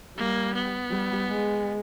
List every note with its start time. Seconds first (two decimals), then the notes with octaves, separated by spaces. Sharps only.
0.18 G3 A#3
0.54 B3
0.91 G3
1.28 G#3